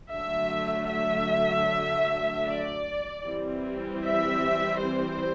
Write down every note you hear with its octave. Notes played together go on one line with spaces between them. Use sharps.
D3 F#3 A3 E5
E5
D5
E3 G3 C4
E5
C5